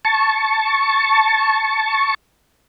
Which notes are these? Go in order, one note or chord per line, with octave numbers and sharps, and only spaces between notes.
A5 C#6